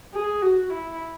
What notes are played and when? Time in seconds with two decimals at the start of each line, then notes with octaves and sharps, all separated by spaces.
0.14 G#4
0.42 F#4
0.70 E4